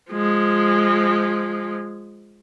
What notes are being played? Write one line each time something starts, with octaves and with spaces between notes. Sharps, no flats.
F3 G#3